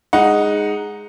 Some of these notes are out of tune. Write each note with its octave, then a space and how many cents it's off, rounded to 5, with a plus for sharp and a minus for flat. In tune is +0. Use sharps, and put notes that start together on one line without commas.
G#3 +0 D#4 +0 F#5 +0